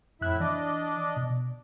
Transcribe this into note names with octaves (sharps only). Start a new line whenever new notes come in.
F2 A2 E4 E5 F#6
E3 D4 D5 D#5
B2